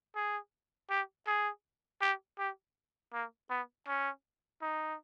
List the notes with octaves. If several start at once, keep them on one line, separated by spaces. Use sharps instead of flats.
G#4
G4
G#4
G4
G4
A#3
B3
C#4
D#4